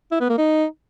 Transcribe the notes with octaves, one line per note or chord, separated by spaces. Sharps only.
E4
B3
A#3
D#4